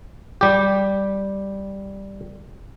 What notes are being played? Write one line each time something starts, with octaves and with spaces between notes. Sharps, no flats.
G3 G4